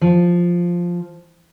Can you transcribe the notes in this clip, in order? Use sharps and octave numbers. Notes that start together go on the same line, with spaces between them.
F3